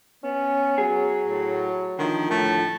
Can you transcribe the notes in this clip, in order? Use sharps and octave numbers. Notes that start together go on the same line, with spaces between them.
B3 C#4
F#3 G#4
A2
D3 D#3 F3
A2 A3